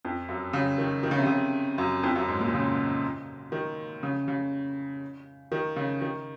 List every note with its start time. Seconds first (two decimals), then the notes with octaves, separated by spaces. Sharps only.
0.05 F2
0.29 F#2
0.53 C#3
0.78 D#3
1.03 D#3
1.11 C#3
1.19 C3
1.27 C#3
1.78 F#2
2.03 F2
2.16 F#2
2.29 G#2
2.40 A#2
2.53 C#3
3.52 D#3
4.03 C#3
4.28 C#3
5.52 D#3
5.76 C#3
6.02 D#3